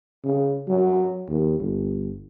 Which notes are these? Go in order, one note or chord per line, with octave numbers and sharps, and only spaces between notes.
C#3
F#3
D#2
G1